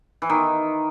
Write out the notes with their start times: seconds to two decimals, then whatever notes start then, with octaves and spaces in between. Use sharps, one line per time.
0.22 E3
0.30 D#3